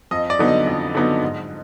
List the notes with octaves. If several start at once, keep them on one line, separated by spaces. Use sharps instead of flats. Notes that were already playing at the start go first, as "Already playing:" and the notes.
F2 D#5
D5
D3 F#3 B3 D#4
D#5
F2
D3 F#3 B3 D#4
G#2